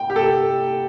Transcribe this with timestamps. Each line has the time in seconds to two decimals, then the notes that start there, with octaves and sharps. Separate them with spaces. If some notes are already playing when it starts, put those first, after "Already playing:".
Already playing: G5
0.10 G4
0.16 A4